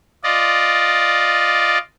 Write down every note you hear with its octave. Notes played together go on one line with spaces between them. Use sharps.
F4 D5 D#5